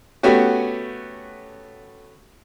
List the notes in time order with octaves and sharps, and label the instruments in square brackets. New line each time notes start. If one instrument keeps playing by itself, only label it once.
[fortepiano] A3 B3 C#4 F#4 G4